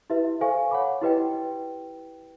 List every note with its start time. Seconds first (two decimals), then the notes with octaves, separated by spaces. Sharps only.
0.10 E4 G4 B4 E5
0.41 A4 C5 F5 G#5 C#6
0.71 C#5 F#5 B5 D6
1.02 E4 G4 B4 D#5 G5